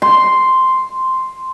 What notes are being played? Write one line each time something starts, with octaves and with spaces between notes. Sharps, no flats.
C6